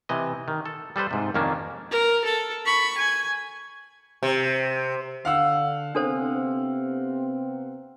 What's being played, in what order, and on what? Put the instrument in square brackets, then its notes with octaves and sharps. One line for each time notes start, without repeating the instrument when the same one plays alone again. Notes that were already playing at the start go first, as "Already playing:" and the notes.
[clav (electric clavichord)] C3 E3 D#5
D#3
A4
G3 A4 B4 C5
G#2 C3
F2 D#3 A#3 C#4 D4
[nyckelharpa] A#4
A4
B5 C#6
G#5
[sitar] C3
[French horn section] D3 [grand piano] F5 F#5 E6
[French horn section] C3 B3 C4 [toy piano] D4 A4 C5